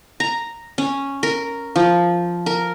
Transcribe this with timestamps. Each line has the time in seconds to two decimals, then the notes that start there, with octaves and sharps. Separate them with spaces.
0.20 A#5
0.78 C#4
1.23 A#4
1.76 F3
2.46 A#4